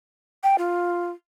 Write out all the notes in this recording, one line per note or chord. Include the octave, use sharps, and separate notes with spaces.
G5
F4